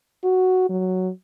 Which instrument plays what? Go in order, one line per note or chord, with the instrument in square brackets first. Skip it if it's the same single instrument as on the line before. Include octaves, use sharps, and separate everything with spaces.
[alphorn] F#4
F#3